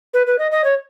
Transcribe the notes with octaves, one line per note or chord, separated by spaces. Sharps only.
B4
B4
D#5
D#5
C#5